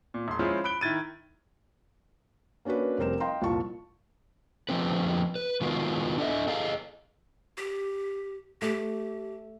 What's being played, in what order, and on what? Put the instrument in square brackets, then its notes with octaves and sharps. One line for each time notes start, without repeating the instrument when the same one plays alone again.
[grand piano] A#2
E1 C6
F3 G#3 C#4 E4 F4 C5
B5 F#6 D7 G7
D#3 E4 G#6 A6 D#7
[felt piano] A#3 C#4 D4 F#4 B4
F1 G3 C4 A#4 C5 E7
D#5 F5 G5 A#5 C6
C2 F2 A#2 F4 A5 C#6
[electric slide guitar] D3 F3 A3 C4 B4
B4
D#3 G#3 B3 F4 F#4
D4 A4 C5 D#5 E5
G#4 A4 D#5 F5
[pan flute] G4
[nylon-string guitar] A3 [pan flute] G4